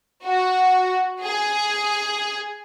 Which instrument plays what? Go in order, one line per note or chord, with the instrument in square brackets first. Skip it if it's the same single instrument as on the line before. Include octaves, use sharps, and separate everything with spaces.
[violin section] F#4
G#4